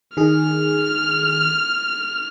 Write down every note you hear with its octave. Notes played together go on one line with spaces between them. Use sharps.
D#3 G#4 F6